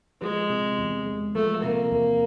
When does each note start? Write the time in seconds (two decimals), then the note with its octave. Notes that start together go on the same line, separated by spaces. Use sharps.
0.21 F3 G#3
0.50 C3
0.79 E2
1.06 G#3
1.35 F3 A3
1.63 C3 A#3
1.91 E2